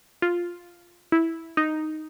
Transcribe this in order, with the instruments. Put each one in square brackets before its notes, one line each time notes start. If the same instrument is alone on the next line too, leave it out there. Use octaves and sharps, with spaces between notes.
[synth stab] F4
E4
D#4